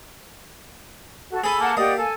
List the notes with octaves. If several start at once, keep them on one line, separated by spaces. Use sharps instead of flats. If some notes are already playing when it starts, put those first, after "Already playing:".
F#4 A4
G#4 A4 G#5 B5 E6
A#3 F#5 A5
A#3 G4 D5 D#5 F#5
A4 G#5